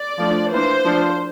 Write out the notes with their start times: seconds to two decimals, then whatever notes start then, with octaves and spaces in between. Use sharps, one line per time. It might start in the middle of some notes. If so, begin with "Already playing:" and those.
Already playing: D5
0.18 F3 A3 D4
0.51 E3 A#3 D4 C5
0.84 F3 A3 D4